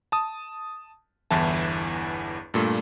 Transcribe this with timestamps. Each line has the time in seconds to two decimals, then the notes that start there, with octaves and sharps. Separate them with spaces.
0.12 A5 D#6
1.31 G1 E2 E3 E4 A5
2.54 G2 A#2 A3